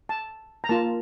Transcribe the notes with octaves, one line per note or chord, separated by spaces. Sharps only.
A5
A#5
A#3 F4 A5